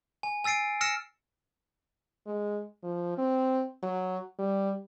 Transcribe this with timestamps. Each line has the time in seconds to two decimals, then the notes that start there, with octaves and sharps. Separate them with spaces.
0.23 G#5
0.44 G#5 E6 A6 C7 D7
0.81 E6 F6 A#6 C#7 E7
2.26 G#3
2.83 F3
3.18 C4
3.83 F#3
4.39 G3